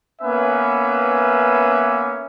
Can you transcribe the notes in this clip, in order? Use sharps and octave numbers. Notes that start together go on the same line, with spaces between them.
A#3 B3 C#4 B4 E5 G#5